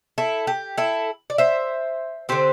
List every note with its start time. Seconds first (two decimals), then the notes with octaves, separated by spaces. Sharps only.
0.18 E4 A4
0.47 G4
0.78 E4 A4
1.30 D5
1.38 C5 E5
2.29 D3 C4 G4 C5